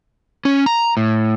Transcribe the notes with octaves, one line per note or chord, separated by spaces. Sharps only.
C#4
A#5
A2